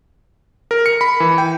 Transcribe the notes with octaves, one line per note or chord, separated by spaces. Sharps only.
A#4
C#7
B5
E3
G5